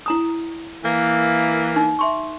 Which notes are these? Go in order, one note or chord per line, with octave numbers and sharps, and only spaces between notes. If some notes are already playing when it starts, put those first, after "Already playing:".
E4 A#5 D#6
E3 A#3
D#4
E5 C6 C#6